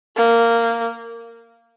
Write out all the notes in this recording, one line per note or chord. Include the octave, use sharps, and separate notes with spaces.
A#3